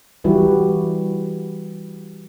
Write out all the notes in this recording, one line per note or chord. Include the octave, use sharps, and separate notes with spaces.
E3 G3 E4 F#4 G4 B4